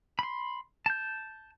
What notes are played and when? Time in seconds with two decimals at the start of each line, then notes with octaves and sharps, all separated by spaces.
0.19 B5 C6
0.86 A5 G6